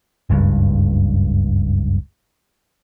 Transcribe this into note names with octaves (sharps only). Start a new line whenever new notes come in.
F#1 C#2 G2